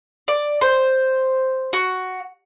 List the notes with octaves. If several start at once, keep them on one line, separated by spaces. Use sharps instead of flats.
D5
C5
F#4